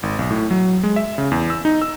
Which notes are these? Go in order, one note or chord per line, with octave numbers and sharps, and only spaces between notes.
G#1
B1
A2
F#3
G#3
E5
C#3
E2
E6
D#4
E6